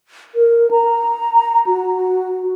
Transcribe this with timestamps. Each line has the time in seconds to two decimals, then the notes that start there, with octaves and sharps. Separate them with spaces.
0.35 A#4
0.71 A#5
1.67 F#4